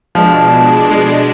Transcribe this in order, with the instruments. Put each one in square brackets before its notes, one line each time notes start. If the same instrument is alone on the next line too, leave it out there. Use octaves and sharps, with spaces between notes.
[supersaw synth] B2 G#3 D4 [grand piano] F3
[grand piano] G#3